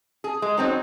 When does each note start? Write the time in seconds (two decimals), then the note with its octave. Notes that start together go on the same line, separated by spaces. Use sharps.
0.24 G#4
0.42 G#3
0.57 F#3 C4 D#4